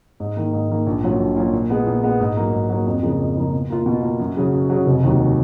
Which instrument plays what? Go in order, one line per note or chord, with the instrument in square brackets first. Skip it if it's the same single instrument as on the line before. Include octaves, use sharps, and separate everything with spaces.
[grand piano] G#2
D#3 A#3
G#2
D#3 A#3
A#1
A#2 F#3 C#4 F4
A#1
A#2 F#3 C#4 F4
A#2
G#3 B3
A#2
G#3 B3
G#2
F#3 A#3
G#2
F#3 A#3
F2
C#3 F3 A#3
F2
C#3 F3 A#3
B2
A#3 F4
B2
A#3 F4
F#2
C#3 F#3
F#2
C#3 F#3
F1
D#2 D#3 F#3